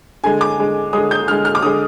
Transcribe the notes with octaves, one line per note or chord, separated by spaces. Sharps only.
D3 G#3 G#5
D6
D3 G#3
D3 G#3 D#6
G6
D3 G#3 F6
F6
D6
D3 G#3 D#6